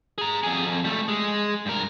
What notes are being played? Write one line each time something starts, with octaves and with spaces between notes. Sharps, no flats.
G#4 A#5
F2 G#4
F2
G3 A3
G#3
G2 A#4